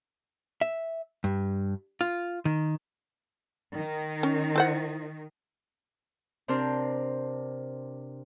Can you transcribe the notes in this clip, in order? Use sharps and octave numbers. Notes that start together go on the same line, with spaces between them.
E5
G2
F4
D#3
D#3
C#4
E4 C5 F#5
C3 C4 D4 A#4 C5